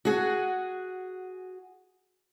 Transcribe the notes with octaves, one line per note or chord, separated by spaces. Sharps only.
F#4 G#4 F#5